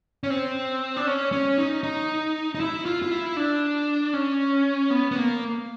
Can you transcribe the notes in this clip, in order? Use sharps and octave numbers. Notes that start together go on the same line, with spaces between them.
C#4
C4
D4
C#4
C#4
D#4
D#4
D#4
E4
F4
F4
E4
D4
C#4
B3
B3
A#3